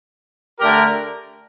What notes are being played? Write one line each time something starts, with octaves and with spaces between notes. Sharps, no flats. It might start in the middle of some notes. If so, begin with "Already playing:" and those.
D3 A3 D4 G4 A#4